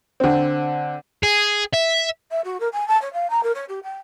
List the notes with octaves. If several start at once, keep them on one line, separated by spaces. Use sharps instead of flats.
D3 C4
G#4
E5
E5
F#4
A#4
G#5
A5
C#5
F5
A#5
A#4
C#5
G4
G5